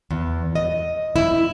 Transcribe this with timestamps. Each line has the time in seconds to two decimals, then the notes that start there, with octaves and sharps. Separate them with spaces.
0.11 E2
0.55 D#5
1.16 E4